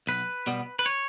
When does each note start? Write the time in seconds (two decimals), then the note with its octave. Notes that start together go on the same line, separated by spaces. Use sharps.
0.07 B1 B4
0.47 B2 G3 B3
0.79 B4
0.86 C#5